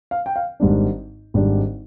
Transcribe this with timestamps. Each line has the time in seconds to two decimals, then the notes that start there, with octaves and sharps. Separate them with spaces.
0.11 F5
0.26 G5
0.36 F5
0.60 G#1 G#2 G3 D4
1.34 G#1 G#2 G3 D4